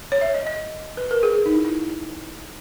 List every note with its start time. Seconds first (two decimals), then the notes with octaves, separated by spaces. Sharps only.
0.12 C#5
0.21 E5
0.34 D#5
0.47 D#5
0.97 B4
1.11 A#4
1.23 G#4
1.45 D#4
1.55 E4
1.65 E4